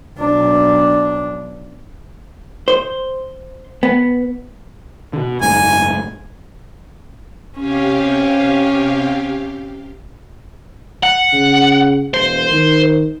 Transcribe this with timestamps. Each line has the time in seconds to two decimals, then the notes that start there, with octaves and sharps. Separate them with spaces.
0.19 B1 D4
2.68 C5
3.83 B3
5.13 B2 D3
5.42 F#1 G#2 G#5
7.57 C3 C#4 G4 C#5 F5
11.03 F#5
11.33 C#3
12.14 E1 C5
12.51 D#3